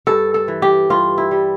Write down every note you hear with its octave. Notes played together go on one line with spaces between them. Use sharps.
G2 A4
A4
E3
G4
G2 F4
E4
G3